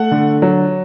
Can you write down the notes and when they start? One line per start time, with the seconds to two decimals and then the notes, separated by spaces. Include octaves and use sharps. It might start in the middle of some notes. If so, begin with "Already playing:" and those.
Already playing: A3 F#5
0.11 D3
0.42 F#3